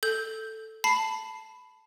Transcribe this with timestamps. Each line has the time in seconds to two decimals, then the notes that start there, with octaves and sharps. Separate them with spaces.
0.03 A4 G6
0.84 A5 B5 C7